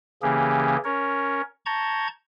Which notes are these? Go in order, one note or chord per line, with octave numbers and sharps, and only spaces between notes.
C#3 E3 A#3 C#4 G4 G#4
C#4 A#4 C#5
A5 A#5 C#6 G6 G#6